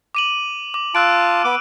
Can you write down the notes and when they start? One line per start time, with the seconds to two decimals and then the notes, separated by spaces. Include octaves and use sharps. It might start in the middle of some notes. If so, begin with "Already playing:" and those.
0.15 D6 D#7 F#7
0.74 D6
0.95 F4 A5 E6 F#6 D7
1.45 B3 D6